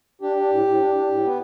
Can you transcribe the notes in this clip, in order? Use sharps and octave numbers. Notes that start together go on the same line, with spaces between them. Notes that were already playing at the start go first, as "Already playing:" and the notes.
D4 G4
D4
A2
A2
D4
D4
A2
B3